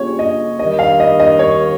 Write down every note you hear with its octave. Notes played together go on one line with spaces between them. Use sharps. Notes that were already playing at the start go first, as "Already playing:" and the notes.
Already playing: C#3 G3 A#3 C#4 F4 C#5
D#5
D#2 D#3 G3 D#5
F5
D#5
D#5
C#5